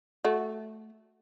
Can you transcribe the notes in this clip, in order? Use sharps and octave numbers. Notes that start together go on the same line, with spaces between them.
A3 F#4